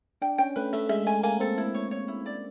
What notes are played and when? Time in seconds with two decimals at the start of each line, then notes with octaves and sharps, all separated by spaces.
0.22 D4 G5
0.38 C#4 G5
0.56 A3 B4
0.73 A3 E5
0.89 G#3 E5
1.06 A3 G#5
1.23 A#3 G#5
1.40 C4 A4
1.58 E4
1.74 C#5
1.91 C#5
2.08 E4
2.26 D5